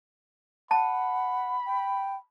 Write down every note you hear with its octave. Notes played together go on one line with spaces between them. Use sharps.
F#5 A5 B5
G5